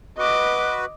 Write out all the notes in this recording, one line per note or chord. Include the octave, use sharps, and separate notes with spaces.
F#4 B4 D#5 D6